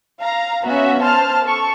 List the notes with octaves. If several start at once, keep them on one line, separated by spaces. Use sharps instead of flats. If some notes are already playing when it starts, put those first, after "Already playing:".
F5 A#5
B3 C#4 F#4 E5
C5 A5 F6
A4 C#6